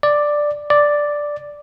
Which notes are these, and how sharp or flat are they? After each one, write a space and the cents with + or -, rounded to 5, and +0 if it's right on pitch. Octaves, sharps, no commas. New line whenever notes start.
D5 +5
D5 +0